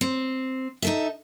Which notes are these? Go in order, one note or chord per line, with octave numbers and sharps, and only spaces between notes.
C4
D#4 A4 E5